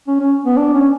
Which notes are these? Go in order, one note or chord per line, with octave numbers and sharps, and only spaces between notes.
C#4
C#4
B3
D4
C#4